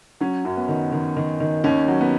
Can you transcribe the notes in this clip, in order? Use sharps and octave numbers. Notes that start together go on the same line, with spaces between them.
F#3 C#4
F#2
B3
D#3
D#3
D#3
D#3
D#2 C#4
F#3
B3